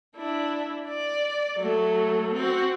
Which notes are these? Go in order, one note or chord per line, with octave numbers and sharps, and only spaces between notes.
D4 E4
D5
F#3 A3
C4 F#4